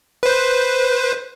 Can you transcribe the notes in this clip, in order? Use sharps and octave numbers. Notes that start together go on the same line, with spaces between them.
B4 C5